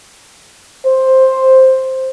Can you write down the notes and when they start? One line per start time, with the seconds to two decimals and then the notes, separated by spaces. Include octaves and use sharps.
0.86 C5